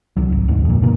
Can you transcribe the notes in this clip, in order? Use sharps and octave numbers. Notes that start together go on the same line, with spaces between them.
C2 F#3
G#1
A1 D2 G#2
F2 A#2
G1 B2 A#3